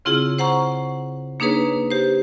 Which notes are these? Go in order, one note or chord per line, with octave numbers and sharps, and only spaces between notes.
C#3 C4 E4 F4 G#4
C5 F#5 A#5 C#6
A#3 D4 D#4 G#4 B4 C#5
G4 C5